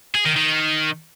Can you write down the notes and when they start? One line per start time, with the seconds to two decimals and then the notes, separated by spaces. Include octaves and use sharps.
0.15 G#4
0.26 D#3
0.36 D#3